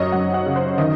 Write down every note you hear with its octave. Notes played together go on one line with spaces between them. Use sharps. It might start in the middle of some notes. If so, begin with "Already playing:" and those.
Already playing: F#2 F#3 C#5 D#5
F#2 F#5
F#5
C#3
C5
D#3 D#5